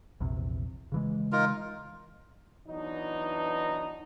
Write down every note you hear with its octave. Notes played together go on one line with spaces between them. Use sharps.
A#1 E2 C3
C#3 E3 G#3
D#4 F4 A#4
E3 F#3 B3 D4 D#4